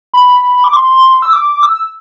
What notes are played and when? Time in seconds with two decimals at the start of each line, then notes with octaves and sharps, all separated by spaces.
0.14 B5
0.64 D6
0.73 C6
1.22 E6
1.33 D6
1.63 E6